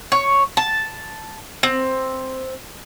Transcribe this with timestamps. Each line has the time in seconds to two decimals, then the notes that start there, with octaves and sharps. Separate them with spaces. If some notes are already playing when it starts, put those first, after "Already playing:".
0.12 C#5
0.57 A5
1.63 C4